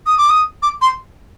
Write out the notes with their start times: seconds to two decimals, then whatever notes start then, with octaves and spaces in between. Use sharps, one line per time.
0.07 D#6
0.18 D6
0.30 D#6
0.63 D6
0.82 C6